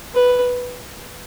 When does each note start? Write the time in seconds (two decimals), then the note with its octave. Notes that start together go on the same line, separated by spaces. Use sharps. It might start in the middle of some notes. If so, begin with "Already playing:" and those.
0.14 B4